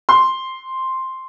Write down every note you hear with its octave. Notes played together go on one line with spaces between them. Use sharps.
C6